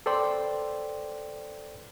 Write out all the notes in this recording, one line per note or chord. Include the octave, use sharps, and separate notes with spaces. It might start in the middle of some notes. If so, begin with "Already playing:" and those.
A4 B4 C5 D5 G5 C6